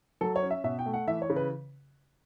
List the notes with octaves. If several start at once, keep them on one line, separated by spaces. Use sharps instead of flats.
F#3 A4
C#5
C#4
E5
B2 E5
G5
A3
F#5
E3 E5
C#5
C#3
B4